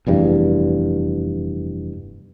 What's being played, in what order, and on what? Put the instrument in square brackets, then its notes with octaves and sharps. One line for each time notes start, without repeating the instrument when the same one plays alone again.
[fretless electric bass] F1 E2 G2